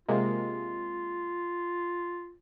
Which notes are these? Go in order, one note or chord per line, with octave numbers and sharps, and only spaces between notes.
C3 G#3 A#3 F4